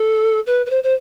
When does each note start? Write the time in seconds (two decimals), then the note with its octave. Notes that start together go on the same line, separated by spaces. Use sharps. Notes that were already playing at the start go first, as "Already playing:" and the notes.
Already playing: A4
0.47 B4
0.66 B4
0.70 C5
0.83 C5